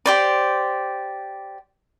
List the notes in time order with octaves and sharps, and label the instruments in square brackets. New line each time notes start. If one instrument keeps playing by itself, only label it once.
[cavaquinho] G4 C5 D5